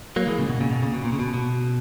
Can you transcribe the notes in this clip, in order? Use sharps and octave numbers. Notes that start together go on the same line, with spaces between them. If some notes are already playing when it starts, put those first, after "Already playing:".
F#3 A#3
E3 G#3
A#2 C#3
B2
A#2 C#3
B2
A#2 C#3
B2
A#2
C#3
B2
B2